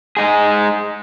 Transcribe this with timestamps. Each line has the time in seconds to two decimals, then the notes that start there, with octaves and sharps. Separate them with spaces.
0.17 G#3 D#4 G#4